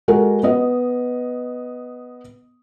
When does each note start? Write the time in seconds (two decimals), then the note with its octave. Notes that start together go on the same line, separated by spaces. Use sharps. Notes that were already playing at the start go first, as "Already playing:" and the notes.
0.08 G#3 F#4 A4 A#4
0.43 B3 D#5